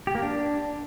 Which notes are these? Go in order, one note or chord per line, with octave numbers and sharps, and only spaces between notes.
G4
A#3
D4